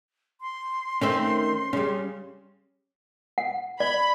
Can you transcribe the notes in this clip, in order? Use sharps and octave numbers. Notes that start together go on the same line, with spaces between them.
C6
D#3 A3 C4 C#4 C5
C#3 G3 C#4
F#5
D5 B5